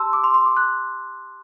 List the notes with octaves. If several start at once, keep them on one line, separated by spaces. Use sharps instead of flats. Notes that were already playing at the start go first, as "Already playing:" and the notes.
Already playing: G4 A5 C6 E6
D6
C6
C6
D6
F#6